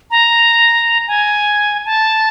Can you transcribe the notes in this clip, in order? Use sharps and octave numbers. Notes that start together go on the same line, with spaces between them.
A#5
G#5
A5